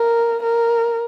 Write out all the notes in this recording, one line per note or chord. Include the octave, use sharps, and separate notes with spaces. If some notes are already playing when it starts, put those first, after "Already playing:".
Already playing: A#4
A#4